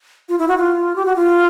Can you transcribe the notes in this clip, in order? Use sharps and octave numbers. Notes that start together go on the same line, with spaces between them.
F4
E4
F#4
F4
G4
F#4
F4